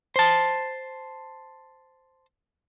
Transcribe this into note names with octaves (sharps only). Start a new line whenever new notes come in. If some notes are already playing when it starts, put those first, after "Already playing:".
C5 A5